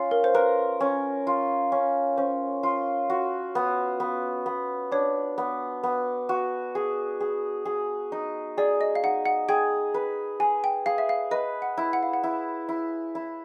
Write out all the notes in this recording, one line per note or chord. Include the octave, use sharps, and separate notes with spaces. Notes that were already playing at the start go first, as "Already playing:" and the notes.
Already playing: C#4 F4
A#4
C5
A#4 B4
C#4
F4
C#4
C#4 C5
F4
F#4
B3
B3
B3
D4 C#5
B3
B3
F#4
G#4
G#4
G#4
D#4
G#4 D5
D#5
F5
D#4 F#5
F#5
G#4 G5
B4
G#4 G#5
G5
G#4 F5
E5
F5
B4 D#5
F#5
E4
F#5
F5
F#5
E4
E4
E4